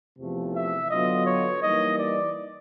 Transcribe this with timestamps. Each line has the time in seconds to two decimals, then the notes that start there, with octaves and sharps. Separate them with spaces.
0.19 E2 C3 F3 A3
0.55 E5
0.90 D3 F#3 B3 D4 F4 D#5
1.26 C#5
1.62 E3 G3 A#3 D#4 D#5
1.98 D5